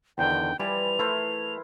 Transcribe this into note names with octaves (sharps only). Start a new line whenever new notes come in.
E2 D3 D#3 G5
E3 F3 G3 D5 G#5 F7
A3 E4 A#4 C5